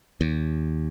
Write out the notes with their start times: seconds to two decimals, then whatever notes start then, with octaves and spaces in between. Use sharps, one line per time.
0.21 D#2